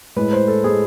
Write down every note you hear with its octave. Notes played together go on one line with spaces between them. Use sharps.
A2 G#3 B4
C5
A4
A2 G#3 G#4